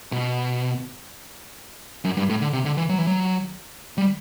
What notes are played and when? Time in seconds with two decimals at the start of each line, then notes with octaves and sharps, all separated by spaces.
0.12 B2
2.05 F#2
2.17 G2
2.29 A2
2.41 D3
2.53 C3
2.65 D3
2.77 E3
2.89 F#3
2.98 E3
3.07 F#3
3.98 G3